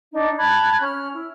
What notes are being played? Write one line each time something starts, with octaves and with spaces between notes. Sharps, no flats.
D4 D#4
A5 B5 F#6 G#6
C#4 F6
E4